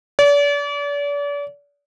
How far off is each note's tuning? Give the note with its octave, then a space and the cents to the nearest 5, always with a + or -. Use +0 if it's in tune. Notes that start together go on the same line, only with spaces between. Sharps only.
D5 -40